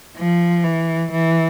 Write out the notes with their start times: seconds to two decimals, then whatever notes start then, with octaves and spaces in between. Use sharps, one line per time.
0.17 F3
0.64 E3
1.11 E3